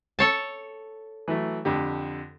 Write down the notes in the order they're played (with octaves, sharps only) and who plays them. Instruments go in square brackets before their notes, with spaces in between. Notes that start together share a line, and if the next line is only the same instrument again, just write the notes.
[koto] A4 C#5 A5
[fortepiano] E3 F#3 A3
F2 D3 G4